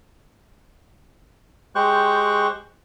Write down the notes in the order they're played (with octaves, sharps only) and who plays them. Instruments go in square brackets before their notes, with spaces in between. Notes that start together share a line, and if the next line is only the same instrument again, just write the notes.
[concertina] G#3 G4 C5 G5 C#6 F#6